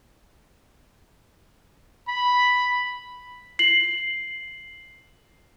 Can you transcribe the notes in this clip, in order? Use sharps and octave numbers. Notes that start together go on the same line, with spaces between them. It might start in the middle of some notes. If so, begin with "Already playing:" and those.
B5
C7 F#7